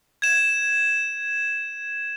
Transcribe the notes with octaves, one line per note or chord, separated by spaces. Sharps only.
G#6 E7